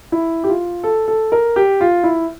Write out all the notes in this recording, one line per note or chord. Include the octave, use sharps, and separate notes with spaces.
E4
G4
F4
A4
A4
A#4
G4
F4
E4